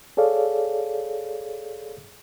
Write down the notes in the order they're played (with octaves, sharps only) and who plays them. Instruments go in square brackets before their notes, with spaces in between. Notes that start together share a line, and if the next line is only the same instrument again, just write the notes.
[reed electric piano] G#4 A4 C#5 D5 F5